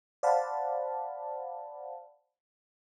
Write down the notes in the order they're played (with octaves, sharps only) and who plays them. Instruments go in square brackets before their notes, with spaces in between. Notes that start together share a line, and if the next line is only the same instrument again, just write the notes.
[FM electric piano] C5 D5 F5 F#5 A5 B5